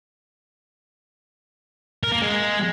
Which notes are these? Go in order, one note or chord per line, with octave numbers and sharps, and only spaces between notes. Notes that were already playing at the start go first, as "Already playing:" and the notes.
A#4
A#3
G#3